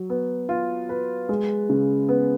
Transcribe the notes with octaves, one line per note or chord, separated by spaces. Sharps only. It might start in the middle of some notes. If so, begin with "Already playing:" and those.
Already playing: F#3
B3
F4
B4
G#3
C#3
B3